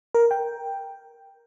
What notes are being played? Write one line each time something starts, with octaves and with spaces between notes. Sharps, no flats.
A#4
G5